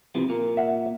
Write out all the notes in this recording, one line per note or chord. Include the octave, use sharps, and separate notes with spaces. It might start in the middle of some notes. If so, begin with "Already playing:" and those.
C3 E3 F3
A#2 A#3
E5 F#5